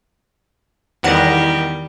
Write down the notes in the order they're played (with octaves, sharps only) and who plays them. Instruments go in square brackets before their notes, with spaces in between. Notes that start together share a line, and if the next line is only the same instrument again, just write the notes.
[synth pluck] E2 F#5 [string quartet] D#3 G3